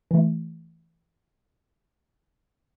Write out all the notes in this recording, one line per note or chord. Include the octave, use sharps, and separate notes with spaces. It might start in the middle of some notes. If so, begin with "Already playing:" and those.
E3 A3